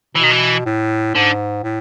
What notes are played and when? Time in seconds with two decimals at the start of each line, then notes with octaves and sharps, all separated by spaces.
0.15 B2 E3
0.23 D#3
0.31 E3
0.66 A2
1.15 G#2 D3
1.63 A2